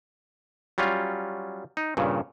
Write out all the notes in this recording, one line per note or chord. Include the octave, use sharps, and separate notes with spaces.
F#3 G3 C#4 F4
D#4
G2 A#2 C#3